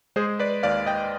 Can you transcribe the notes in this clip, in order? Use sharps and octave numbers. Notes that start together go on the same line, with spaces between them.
G#3 G#4 C5
B4 D5
D#2 D5 F5
D#5 G5